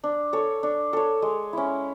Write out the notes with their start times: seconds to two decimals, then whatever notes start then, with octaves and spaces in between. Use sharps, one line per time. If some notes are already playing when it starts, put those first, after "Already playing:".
0.04 D4
0.33 A4 C#5
0.63 D4
0.93 A4 C#5
1.22 G#3
1.53 C#4 E4